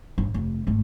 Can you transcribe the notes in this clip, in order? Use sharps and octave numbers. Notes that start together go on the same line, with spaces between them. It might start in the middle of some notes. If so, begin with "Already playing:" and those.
G1
F1
G#1 A3